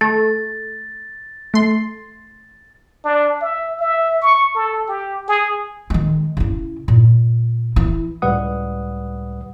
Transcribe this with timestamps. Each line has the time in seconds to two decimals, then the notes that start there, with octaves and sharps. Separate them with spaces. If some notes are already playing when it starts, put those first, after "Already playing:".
0.01 A3 A6
1.54 A3 C6
3.04 D4
3.41 E5
3.80 E5
4.22 C#6
4.55 A4
4.88 G4
5.28 G#4
5.90 D#3 G#3
6.37 C#3 E4
6.88 A#2
7.76 E3 E4
8.22 C#2 A2 G3 B4 F#5 D#6